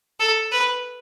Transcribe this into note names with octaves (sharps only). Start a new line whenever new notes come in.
A4
B4